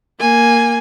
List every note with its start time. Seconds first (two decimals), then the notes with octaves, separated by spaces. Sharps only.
0.20 A#3 G#5